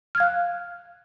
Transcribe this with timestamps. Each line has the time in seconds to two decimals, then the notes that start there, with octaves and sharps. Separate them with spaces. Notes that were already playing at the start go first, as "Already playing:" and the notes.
0.15 F6
0.17 G#6
0.20 F5
0.23 F#6